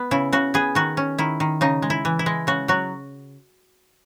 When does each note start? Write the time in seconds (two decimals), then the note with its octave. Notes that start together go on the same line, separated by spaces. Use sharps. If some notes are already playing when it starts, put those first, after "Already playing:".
Already playing: B3
0.11 C#3 E4
0.32 C#3 F#4
0.54 B3 G#4
0.75 D#3 F#4
0.97 C#4
1.18 D#3 E4
1.40 D#3
1.61 C#3 D#4
1.82 G#3
1.90 E4
2.05 E3
2.19 E4
2.26 G#3
2.47 C#3 F#4
2.68 F#3 F#4